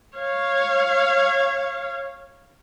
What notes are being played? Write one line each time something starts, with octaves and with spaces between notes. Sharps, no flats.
C#5 F5